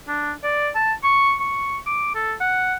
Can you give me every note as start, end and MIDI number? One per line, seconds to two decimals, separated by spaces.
0.08 0.32 62
0.43 0.69 74
0.75 0.93 81
1.03 1.35 85
1.40 1.78 85
1.86 2.13 86
2.15 2.33 69
2.41 2.75 78